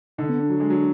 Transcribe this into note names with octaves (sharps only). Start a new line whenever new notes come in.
D3 D#4
B3
D4
F#3
G#3
F#3